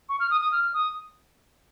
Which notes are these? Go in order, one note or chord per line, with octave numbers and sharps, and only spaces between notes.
C#6
F6
D#6
D#6
F6
D#6